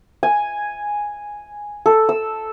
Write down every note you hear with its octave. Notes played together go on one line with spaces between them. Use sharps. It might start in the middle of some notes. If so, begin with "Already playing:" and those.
G#5
A4
E6